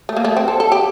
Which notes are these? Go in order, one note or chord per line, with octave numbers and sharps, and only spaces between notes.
A3
A#3
A3
C4
A4
A4
G4